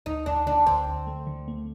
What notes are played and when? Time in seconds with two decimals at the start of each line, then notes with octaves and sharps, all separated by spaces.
0.06 D2 D#4
0.26 D2 D4
0.47 D3 D4
0.66 D2 C4
0.87 D2
1.07 A3
1.27 D3
1.48 A3